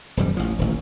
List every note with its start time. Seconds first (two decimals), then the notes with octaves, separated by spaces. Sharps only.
0.17 D#1 F#2 G3
0.37 A1 F3
0.59 D#1 A1